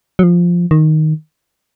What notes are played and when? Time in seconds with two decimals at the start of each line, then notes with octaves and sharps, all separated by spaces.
0.19 F#3
0.23 F3
0.71 D#3